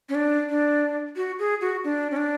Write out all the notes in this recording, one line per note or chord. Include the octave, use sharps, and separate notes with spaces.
C#4
D4
D4
F#4
G#4
F#4
D4
C#4
D4